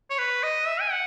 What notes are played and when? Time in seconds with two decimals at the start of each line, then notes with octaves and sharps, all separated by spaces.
0.10 C#5
0.18 B4
0.43 D#5
0.67 E5
0.81 G#5
0.91 F#5